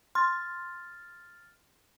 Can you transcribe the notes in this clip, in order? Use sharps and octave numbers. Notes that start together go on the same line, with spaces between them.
C6 F6 A6